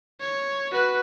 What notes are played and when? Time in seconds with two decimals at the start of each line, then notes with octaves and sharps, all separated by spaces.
0.20 C#5
0.71 F#4 B4